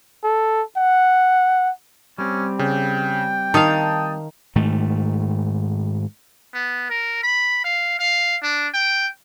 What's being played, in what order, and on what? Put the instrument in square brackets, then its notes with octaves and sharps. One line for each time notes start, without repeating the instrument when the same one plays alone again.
[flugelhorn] A4
F#5
[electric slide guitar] G3 C4 [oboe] C#4
[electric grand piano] C#3 [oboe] G5
[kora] D#3 F5 [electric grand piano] A5 D#6
[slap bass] G#2 D#3 A3
[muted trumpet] B3
A#4
B5
F5
F5
D4
G5